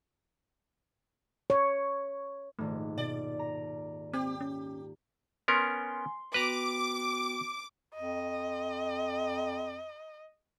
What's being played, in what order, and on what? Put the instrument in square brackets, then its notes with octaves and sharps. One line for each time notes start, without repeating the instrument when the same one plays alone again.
[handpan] C#5
[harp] D#1 G#2 [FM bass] A3
[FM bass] B2 [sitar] D5
[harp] A#5
[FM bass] C4 [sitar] G4
[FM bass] C#4
[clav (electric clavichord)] B3 C#4 A#4 [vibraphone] G#5 [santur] C6
[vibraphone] B3 F#4 G5 [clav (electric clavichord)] B4 A#5 [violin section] D6
[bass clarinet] F2 [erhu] D#5